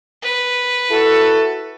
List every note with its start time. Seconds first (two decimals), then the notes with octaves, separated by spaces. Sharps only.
0.22 B4
0.91 E4 F#4 A4